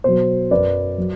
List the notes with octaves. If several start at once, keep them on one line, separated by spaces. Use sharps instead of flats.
B2 F#3 C5
F#2 F#3 B4 D5
F#3